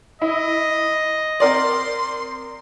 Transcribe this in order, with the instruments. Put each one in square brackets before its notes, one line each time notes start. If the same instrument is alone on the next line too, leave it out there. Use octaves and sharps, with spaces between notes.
[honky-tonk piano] E4 [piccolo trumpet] D#5
[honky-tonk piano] C4 A#4 D5 [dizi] C6